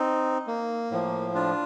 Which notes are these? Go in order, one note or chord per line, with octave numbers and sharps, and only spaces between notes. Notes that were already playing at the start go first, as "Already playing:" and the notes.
Already playing: C4 D#4
A#3
A2 F3
D4 F4